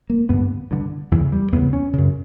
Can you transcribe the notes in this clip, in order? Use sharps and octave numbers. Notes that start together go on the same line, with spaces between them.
A#3
G2 D3 B3
G2 D3
E2 C#3 E3
G3
E2 C#3 B3
C#4
F#2 C#3